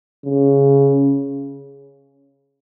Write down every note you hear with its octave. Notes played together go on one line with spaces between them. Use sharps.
C#3